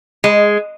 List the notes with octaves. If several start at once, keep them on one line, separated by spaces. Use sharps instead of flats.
G#3